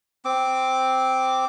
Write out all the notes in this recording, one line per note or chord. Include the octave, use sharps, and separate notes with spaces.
C4 D6